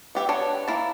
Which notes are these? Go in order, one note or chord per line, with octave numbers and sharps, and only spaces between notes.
B3 G4 E5
B3 D4 C#5
A#3 E4 A5